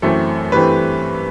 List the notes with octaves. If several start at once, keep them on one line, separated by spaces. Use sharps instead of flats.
F#2 E3 A3 C4 A4
G2 E3 A3 C4 B4